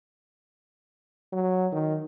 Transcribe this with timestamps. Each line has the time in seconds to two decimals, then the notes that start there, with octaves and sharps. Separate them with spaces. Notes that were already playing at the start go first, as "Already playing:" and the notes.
1.33 F#3
1.72 D#3